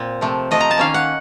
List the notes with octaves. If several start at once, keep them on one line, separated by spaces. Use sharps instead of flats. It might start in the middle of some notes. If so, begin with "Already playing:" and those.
Already playing: A#2 C4
C3 F3 A3
C3 F3 A3 D#5
A#5
A5
D#3 A#3 C#4 F5
F#5